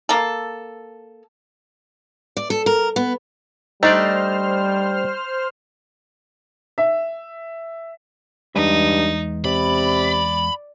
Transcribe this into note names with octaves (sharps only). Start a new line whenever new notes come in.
A#3 A4
D5
A4
A#4
B3
G3 A3 D4 D#4 C5 D5 F6
E5
E2 G2 G#3 D#4 E5
C3 D5 B5